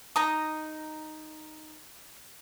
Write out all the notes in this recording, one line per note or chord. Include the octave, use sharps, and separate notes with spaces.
D#4 A#5 D#6